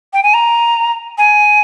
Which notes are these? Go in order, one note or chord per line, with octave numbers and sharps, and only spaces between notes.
G5
G#5
A#5
G#5